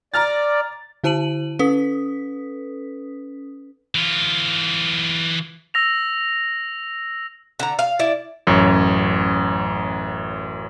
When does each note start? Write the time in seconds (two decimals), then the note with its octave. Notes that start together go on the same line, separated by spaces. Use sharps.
0.14 D5 A#5 F6 A6
1.04 D3 E4 C5 A5 D#7 F#7
1.59 C#4 A4 B4 D#6 B6
3.95 E3 F4
5.74 E6 A#6 F7
7.59 D3 A#5
7.79 F5
7.99 E4 D5
8.47 A1 F#2 C#5